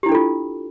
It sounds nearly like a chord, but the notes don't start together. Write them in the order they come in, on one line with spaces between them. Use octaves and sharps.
G4 E4 D4 A4 F4